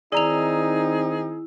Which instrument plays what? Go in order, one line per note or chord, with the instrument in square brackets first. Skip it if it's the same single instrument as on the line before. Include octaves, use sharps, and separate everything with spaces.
[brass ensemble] D#3 C4 D#4 [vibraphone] E4 [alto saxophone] G#4 [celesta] D5 A#5 F7